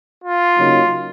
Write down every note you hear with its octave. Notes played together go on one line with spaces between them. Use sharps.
F4
C#3 F#3 A#3 D#4